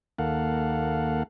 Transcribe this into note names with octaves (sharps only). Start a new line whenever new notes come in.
D#2 A#3 A4 F5 F#5